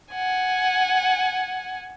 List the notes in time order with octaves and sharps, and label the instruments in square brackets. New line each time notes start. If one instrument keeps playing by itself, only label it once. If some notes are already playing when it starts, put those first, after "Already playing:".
[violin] F#5 G#5